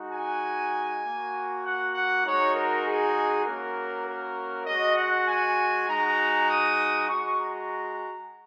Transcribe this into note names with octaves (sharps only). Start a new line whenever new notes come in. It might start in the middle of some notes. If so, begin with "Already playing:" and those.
Already playing: G#3 D#4 F#4
G#5
A#3 F#4
F#5
F#5
G#3 D#4 F#4 C#5
A#4
G#4
A#3 C#4 F#4 A#4
A#4
G#3 F#4 D#5
F#5
G#5
G#3 D#4 F#4 A#5
D#6
G#3 F#4 C#6
A#5